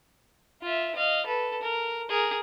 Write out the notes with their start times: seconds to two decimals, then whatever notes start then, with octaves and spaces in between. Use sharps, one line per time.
0.62 F4 E5
0.96 D#5 F5
1.26 A4 B4
1.62 A#4
2.09 G#4 A#4